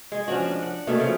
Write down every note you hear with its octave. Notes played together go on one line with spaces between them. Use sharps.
G#3
F3 C#4 D4 F#4
D4
F#5
B2 A3 A#3 C#4
C#3 F3